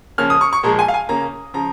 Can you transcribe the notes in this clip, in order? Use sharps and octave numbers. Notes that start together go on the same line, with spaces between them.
C#3 F3 A#3 C#4 F6
D#6
C#6
C#6
A#2 F3 G#3 A#5
G#5
F5
G#5
C#3 A#3 C#4 A#5
C#3 F3 A#5